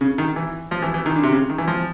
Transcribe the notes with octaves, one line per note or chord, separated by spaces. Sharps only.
C#3
D#3
E3
F3
E3
E3
D#3
D3
C3
C#3
D#3
E3
F3